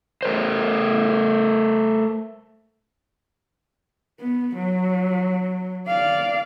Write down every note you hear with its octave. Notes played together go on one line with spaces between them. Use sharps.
A3 A#4 C5
B3
F#3
D5 F5